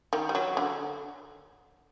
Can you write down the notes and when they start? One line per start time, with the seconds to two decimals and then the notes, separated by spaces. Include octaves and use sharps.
0.13 D#3
0.29 G3
0.35 F#3
0.57 D3